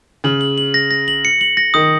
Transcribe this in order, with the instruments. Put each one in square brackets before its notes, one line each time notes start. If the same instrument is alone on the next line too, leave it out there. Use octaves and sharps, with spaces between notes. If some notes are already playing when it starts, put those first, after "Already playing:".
[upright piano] C#3 [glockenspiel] F#7
[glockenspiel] F#7
F#7
A#6
A#6
F#7
C#7
F#7
A#6
[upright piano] D#3 [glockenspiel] D#6